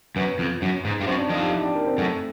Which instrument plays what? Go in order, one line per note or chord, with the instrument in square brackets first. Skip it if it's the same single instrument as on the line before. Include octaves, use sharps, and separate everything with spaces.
[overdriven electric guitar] F#2 [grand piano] B3 B4
[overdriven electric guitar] F2
F#2
G#2
G2
[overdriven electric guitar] F#2 [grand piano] C4 C5
[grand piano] D4 D5
[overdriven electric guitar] F2 [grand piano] D#4 D#5
[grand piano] G4 G5
E4 E5
D4 D5
A#3 A#4
C4 C5
[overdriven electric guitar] F#2 [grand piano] A3 A4